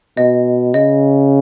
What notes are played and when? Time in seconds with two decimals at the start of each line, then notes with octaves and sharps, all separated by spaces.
0.17 B2 D#5
0.74 C#3 D#5